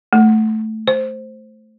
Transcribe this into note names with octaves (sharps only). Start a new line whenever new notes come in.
A3
C5